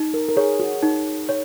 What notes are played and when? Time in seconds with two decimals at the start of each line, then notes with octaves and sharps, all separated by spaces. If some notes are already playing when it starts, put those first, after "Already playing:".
Already playing: D#4
0.14 A#4
0.28 A#4
0.37 G#4 C#5
0.60 F#4
0.83 D#4
1.29 C#5